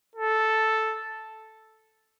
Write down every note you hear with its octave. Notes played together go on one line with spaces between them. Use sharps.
A4